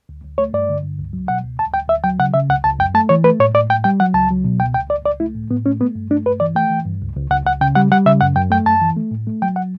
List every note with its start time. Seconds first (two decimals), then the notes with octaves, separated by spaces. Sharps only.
0.09 D2
0.24 D2
0.38 A3 C#5
0.53 G2 D5
0.69 D3
0.83 G2
0.99 C#2
1.13 F#3
1.28 B2 F#5
1.44 C#2
1.59 D2 A5
1.74 D2 G5
1.88 D2 E5
2.04 F#3 G5
2.19 C#3 F#5
2.34 C#3 E5
2.49 C#2 F#5
2.64 C#2 A5
2.79 F#2 G5
2.94 A3 A5
3.09 E3 C#5
3.24 A3 B4
3.40 A2 C#5
3.54 A2 D5
3.70 A2 G5
3.84 G3 G5
4.00 F#3 F#5
4.14 C#2 A5
4.30 F#3
4.44 B2
4.59 C#2 G5
4.74 C#2 G5
4.90 C#2 D5
5.05 C#2 D5
5.20 A3 E4
5.35 A2
5.51 A2 B3
5.65 A3 C#4
5.80 A3 B3
5.95 G2
6.11 A3 D4
6.26 G2 B4
6.40 E3 D5
6.55 A3 G5
6.70 E3
6.85 G2
7.01 C#2
7.16 C#2
7.30 C#2 F#5
7.46 C#2 F#5
7.61 C#3 G5
7.75 G3 F#5
7.91 G3 F#5
8.06 C#3 E5
8.21 F#2 F#5
8.36 F#2 G5
8.51 A3 G5
8.66 F#2 A5
8.82 E3
8.96 A3
9.11 A2
9.27 A3
9.42 F#3 G5
9.56 F#5